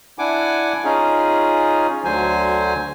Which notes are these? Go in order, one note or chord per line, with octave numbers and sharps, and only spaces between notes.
D4 E4 F#5 G#5 D6
C#4 D#4 F4 G#4
D2 D3 F#3 C5 G#5